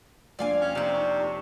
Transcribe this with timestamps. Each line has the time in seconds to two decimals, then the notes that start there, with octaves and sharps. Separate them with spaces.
0.39 F2 A#3 D4 D5 F5 G#5
0.61 C#4
0.75 C3 D4 D#4
0.94 C#6
1.24 C#5